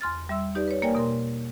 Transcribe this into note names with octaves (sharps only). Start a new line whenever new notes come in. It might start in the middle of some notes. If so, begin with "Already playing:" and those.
E2 C6 F6 A6
G3 E5 C6 E6
D#4 G4 B4 D5
B4 C#5
A#3 A#4 C#5 D5 G5 G#5
B2 A#4 C6